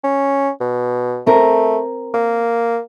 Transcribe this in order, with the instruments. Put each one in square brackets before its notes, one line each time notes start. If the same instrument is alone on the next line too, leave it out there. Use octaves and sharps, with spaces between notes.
[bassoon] C#4
B2
[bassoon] A3 [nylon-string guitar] C4 A#4
[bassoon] A#3